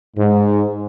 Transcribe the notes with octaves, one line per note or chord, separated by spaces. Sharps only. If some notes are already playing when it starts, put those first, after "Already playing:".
G#2